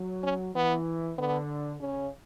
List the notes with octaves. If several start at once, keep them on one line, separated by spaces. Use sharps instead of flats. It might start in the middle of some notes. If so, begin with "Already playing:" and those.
Already playing: F#3
C#4
E3 B3
D3 B3
C#3 C#4